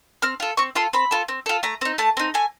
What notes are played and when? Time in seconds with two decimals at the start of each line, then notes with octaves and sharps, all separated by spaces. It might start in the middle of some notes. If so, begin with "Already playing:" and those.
0.22 C4 F6
0.40 F4 A4
0.57 C4 C#6
0.75 F4 A4 C6
0.93 C4 B5
1.11 F4 A4
1.28 C4
1.46 F4 A4
1.63 A3 A#5
1.81 C4 D#4
1.98 A3 A5
2.17 C4 D#4
2.34 A3 G#5